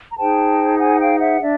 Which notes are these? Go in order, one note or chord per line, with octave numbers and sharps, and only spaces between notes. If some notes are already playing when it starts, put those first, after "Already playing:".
A#5
D#4 G#4 C5 G5 A5
F#5 G#5
F5 G5
E5 F#5
D4 D5 E5